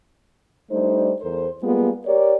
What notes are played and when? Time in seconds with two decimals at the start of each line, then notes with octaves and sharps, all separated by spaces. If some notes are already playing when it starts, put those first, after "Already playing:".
0.71 G3 A3 D4 D#4 C5
1.21 E2 A4 A#4 C5
1.62 G3 G#3 A#3 B3 F4 G#4
2.06 G4 A#4 C#5 D5